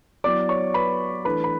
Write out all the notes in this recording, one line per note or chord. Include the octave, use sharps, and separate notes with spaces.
F#3 B3 E4 D5 D6
C#5 C#6
B4 B5
E3 A3 D4 B4 B5
B5